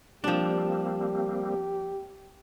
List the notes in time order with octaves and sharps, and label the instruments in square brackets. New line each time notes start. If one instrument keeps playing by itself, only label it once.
[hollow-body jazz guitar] F3 D4 [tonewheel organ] G3 A#3 C4 [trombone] G4